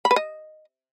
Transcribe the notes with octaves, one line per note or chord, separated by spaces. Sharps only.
B5
B4
D#5